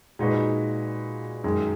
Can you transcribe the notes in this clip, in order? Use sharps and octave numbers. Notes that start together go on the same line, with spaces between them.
A#2 G#3 D#4 F#4 B4
F#2 D#3 G#3